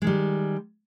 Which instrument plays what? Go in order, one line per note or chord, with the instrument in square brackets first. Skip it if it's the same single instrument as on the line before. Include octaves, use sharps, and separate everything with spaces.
[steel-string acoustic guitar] G#3
D#3
G3